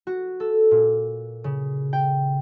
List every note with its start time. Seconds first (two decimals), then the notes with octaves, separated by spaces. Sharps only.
0.07 F#4
0.40 A4
0.71 A#2
1.44 C#3
1.93 G5